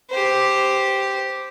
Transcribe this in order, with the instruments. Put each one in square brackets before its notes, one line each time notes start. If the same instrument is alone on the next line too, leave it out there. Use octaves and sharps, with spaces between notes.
[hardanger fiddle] G4 C5